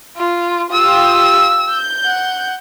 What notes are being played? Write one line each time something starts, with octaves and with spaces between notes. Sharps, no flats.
F4
F4 G4 D#6 E6
G6
F#5